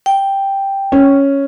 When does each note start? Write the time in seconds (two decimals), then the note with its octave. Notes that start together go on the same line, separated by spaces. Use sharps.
0.06 G5
0.92 C#4